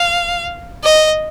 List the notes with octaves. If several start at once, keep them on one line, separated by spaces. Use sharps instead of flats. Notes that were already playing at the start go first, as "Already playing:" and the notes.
Already playing: F5
D#5